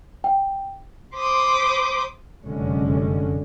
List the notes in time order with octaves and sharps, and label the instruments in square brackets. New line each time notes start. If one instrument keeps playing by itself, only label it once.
[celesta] G5
[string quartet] C5 B5 C6 D6 D#6
[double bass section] F1 F#2 D3 G#3 C#4